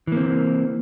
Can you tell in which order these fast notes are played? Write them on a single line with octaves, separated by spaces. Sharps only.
E3 A#3 C4